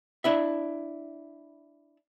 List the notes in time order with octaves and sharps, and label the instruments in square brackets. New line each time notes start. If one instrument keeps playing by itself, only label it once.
[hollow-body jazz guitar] D4 E4 E5